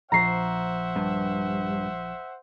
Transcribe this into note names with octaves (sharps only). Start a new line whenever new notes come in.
A#1 F3 C5 E5 F#5 A#5 C#6 C7
G2